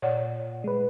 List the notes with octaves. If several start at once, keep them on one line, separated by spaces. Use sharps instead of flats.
A#2 C#5 D5 F#5
G#3 B4